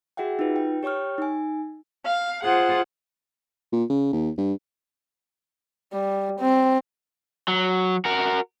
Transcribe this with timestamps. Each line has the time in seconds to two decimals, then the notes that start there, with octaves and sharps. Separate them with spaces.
0.17 F#4 G#4 E5 F#5 G5
0.39 D#4 F4 B4
0.56 G5
0.83 G4 C#5 G5 C#6 F6
1.18 D#4 G#5
2.05 F5
2.43 F4 G#4 C5 F#5
3.73 A#2
3.90 C#3
4.13 D#2
4.38 G2
5.93 G3
6.41 C4
7.48 F#3
8.05 F#4 A#4